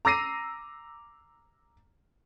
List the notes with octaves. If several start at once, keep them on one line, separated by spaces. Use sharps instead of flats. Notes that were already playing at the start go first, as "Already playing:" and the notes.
A#5 D6 E6 A#6 C7 D#7